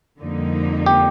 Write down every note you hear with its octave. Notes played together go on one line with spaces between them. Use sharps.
F2 D3 G3 A#3 D#4
G4